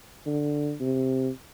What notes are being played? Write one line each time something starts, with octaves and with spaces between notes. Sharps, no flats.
D3
C3